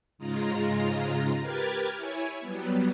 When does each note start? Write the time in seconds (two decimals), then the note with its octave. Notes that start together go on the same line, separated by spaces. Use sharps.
0.18 G#2 C#3 G#3 F4 A#5
1.40 G4 A#4 B4 F6 G#6 A6
1.95 E4 C#5 G#5
2.40 F#3 G3 B3